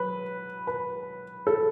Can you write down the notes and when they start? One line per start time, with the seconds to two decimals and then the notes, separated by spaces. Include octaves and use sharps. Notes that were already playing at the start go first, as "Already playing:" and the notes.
Already playing: F#3 B4
0.67 B4
1.47 A4